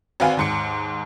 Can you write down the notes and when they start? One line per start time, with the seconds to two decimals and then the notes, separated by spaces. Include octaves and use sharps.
0.20 G#1 C4 F#4 B4 F5 G#5
0.37 D#2 G#2 C#7